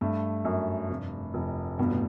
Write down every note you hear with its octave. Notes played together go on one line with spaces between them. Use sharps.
G2 A3
F#2
F1
F1
G2 B2
A2